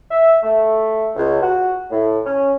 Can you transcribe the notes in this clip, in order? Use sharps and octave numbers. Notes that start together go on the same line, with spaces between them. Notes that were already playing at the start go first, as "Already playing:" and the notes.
E5
A3
C#2
F#4
A2
C#4